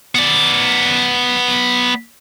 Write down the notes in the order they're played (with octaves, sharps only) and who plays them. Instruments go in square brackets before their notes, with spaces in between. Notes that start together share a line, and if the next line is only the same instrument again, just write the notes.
[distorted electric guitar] B3 D5